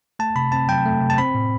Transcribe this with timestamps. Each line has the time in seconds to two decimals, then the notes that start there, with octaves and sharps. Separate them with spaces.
0.19 A3 A5
0.36 C3 B5
0.52 C4 A5
0.69 F#3 G5
0.85 A3
1.02 C3
1.10 A5
1.18 C4 B5
1.35 A2